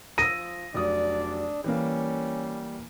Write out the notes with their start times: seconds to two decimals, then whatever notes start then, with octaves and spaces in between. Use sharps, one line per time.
0.18 F3 D#6 E6 A#6 D#7
0.74 F1 F#3 D4 D5 D#6
1.64 E3 G3 A#3 C#4